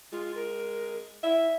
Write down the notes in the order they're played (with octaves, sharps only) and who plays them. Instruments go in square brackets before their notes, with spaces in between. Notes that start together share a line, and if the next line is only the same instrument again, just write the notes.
[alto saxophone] G#3 [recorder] F4
[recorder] A#4
[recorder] E4 [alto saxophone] E5